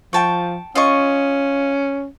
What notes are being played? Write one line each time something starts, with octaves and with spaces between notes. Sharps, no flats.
F3 G5 A5 C#6
C#4 F4 D#5 C#6